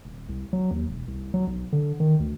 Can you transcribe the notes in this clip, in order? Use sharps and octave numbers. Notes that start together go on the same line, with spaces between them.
D#1
C2
F#3
D#2
E1
C2
F#3
B1
D3
D#3
D2